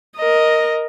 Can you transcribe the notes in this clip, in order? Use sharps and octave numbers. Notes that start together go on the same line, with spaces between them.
A#4 D#5